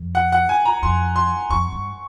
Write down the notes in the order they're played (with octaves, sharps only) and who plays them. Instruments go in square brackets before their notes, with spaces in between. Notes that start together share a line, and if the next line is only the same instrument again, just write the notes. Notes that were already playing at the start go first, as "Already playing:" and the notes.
Already playing: [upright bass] F2
[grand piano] F#5
F#5
G#5
A#5
[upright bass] F2 [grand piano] C6
[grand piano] C6
[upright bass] F2 [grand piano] C#6
[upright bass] G2